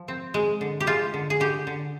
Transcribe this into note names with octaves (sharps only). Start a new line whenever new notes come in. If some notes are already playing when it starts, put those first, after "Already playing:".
Already playing: F3
C4
G#3
D3
G4
G#3 F4
D3
G#4
D3 G4
D3